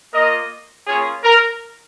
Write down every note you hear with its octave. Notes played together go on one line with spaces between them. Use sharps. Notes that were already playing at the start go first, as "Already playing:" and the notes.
A#3 F4 A#4 D#5
A#3 C#4 F4 G#4 C#5
A#4